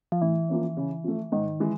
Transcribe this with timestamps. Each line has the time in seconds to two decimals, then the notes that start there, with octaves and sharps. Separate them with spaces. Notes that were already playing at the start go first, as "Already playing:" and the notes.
0.12 F3
0.22 A2 E3
0.49 F3 A#3 C#4
0.77 C#3
1.04 F3 A3
1.32 G#2 D#3
1.60 E3 G#3